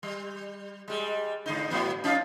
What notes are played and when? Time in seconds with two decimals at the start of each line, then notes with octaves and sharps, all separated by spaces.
0.03 G3
0.88 G3 G#3
1.46 G#2 D3 D#4
1.70 G#2 F#3 B3
2.04 C#4 D#4 F4